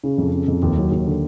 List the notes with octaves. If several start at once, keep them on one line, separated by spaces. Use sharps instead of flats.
C#3
F2
C#3
F2
D#2
F#3
D#2
D3